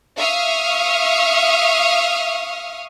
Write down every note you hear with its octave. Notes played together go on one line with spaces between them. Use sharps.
E5 F5 C#6 D#6 F6